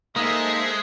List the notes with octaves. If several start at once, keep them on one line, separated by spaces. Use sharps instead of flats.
G#3 A#3 D#4 A4 C5 E5 D#6